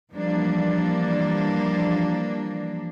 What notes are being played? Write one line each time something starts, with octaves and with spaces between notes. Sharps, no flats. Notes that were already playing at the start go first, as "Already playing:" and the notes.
E3 F3 G3 A#3 D4